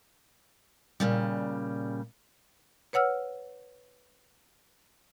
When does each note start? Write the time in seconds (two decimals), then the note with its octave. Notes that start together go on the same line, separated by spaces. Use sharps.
1.00 A#2 C#3 G3
2.93 B4 C#5 F#5 E6 F6